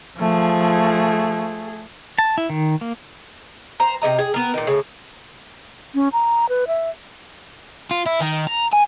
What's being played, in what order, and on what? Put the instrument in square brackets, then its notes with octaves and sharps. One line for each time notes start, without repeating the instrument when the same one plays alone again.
[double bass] F3 [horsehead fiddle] A3 G#4
[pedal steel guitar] A5
E4
D#3
A#3
[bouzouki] C5 A#5
C3 G3 D#5 A#5
G#4
B3 A#4
A#2 D#3
A2 C#3
[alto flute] C#4
A#5
B4
E5
[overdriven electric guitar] F4
E4
D#3
A#5
G#5